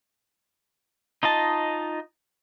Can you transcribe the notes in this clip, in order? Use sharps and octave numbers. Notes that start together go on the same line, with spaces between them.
D#4 F4 D#5 A5